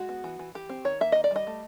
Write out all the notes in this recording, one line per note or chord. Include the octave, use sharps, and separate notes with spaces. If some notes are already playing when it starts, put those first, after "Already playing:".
Already playing: G#3 F#4
B3
E3
E3
E3 G4
C4
D#3 C#5
A#3 E5
D#3 D#5
D5
G3 D#5
A3